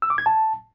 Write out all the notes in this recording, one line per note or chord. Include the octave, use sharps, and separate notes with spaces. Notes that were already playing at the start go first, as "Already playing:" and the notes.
E6
D6
G#6
A5